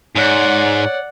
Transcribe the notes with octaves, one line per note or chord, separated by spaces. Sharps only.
G#2 C#5 D5 F#5